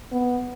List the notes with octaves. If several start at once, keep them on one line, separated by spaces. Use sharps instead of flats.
B3